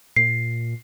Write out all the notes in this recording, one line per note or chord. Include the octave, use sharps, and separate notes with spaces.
A#2 C7